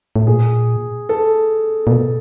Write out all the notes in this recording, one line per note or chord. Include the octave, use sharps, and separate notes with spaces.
A2
A#2 G#4
A4
A#2
B2